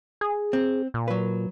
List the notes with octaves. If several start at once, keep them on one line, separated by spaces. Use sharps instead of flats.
G#4
C4
A#2
F#3 B4